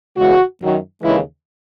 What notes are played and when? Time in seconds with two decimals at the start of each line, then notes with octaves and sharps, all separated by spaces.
0.17 E2 C#3 G#3 F#4
0.60 F#2 D#3 F#3
1.02 D#2 C#3 E3 G#3 E4